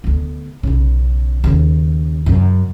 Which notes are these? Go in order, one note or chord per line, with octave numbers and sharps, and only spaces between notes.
D2 B3
B1 C#3
D#2 C#3
F#2 C#3